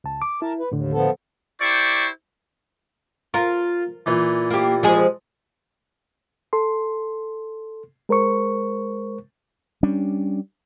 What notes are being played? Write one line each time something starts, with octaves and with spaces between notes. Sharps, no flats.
C#2 A5
D6
E4 A#4 A5
B4
D#2 A2 D3
F3 B3 A4
E4 G4 C5 D5 C#6
F4 A#4
A#2 E3
A#3 G4
F3 G#3 G#4
A4 C6
G#3 A#4 C5 C#6
G3 C#4 D4